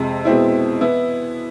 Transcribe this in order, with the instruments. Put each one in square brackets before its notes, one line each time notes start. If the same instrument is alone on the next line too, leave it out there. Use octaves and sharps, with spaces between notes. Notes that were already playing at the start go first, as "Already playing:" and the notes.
Already playing: [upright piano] F2 C3 G#3
B2 G#3 C4 E4
E3 B3 E4